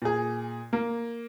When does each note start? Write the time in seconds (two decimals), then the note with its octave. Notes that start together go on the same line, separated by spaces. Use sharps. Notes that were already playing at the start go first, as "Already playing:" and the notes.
0.02 A#2 G#4
0.73 A#3